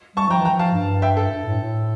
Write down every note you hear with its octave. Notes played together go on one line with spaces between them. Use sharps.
G3 A5 C#6
F3 G5 A#5
E3
G5 A#5
F3
F5 A5
G2
E5 G5
A4
G2
A2
A2